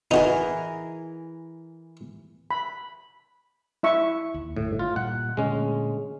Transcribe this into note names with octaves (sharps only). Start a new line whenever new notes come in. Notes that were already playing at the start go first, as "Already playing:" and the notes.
E3 D#4 F#4 G#4 A#4
B5
E4 E5 C#6
D#2
G1 A2
F4
A#2 G3 F#5
A#2 D3 G#3 A3 C#4